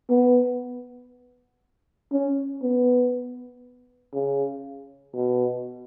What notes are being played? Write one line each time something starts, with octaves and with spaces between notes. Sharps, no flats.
B3
C#4
B3
C#3
B2